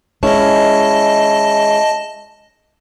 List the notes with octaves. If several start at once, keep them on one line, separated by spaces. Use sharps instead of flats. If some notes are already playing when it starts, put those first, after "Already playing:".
G#3 C#4 E4 D#5 A5